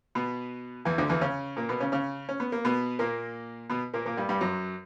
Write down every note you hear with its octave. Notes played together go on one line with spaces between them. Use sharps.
B2 B3
E2 E3
D2 D3
E2 E3
C#3 C#4
A#2 A#3
B2 B3
C#3 C#4
C#3 C#4
C#4
B3
A#3
B2 B3
A#2 A#3
B2 B3
A#2 A#3
A#2 A#3
G2 G3
G2 G3
F#2 F#3